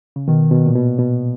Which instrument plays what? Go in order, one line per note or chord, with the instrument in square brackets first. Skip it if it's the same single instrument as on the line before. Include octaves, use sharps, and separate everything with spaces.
[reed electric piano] C#3
[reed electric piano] B2 [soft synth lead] D#3
[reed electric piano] B2
A#2
B2
B2